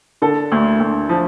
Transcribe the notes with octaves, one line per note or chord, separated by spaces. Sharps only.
D3 A4
D2
D2
F3